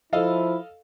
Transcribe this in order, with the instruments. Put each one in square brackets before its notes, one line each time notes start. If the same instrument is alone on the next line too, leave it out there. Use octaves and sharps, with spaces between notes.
[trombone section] F3 E4 [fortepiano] A4 D#5 F5